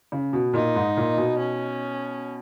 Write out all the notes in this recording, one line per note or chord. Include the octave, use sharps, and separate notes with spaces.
C#3
B2
A#2 D#4
G#2
A#2
B2
C#4